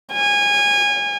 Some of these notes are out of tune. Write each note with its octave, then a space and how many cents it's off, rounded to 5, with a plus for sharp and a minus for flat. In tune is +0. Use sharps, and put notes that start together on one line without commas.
G#5 -25